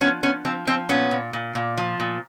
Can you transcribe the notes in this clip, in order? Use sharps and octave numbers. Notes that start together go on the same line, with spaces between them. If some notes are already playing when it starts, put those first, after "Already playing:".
F3 B3 C#4
F3 B3 C#4
F3 C4
F3 C4
A#2 B3 C#4
A#2
A#2
A#2
F3
A#2